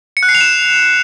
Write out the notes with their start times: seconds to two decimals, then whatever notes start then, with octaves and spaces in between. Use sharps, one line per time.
0.17 C#7
0.23 F#6
0.29 C7
0.35 F7
0.41 E7